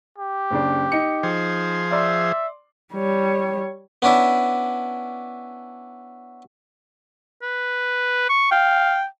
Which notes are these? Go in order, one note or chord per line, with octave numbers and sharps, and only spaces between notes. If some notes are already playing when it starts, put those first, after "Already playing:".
G4
F#1 C#3 D4
D#4 C#7
F3 G#4 C5
D5 E5 C6
G3 C#5
B3 C#4 D4 E4
B4
C#6
F5 G5